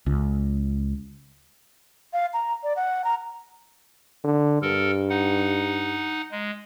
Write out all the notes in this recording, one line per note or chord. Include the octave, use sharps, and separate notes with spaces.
C#2
F5
A#5
D5
F#5
A#5
D3
G2 A4 A#4
D#4 F#5
G#3